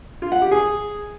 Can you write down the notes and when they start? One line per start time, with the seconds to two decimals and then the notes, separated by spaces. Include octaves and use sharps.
0.22 F4
0.32 F#5
0.42 G4
0.51 G#4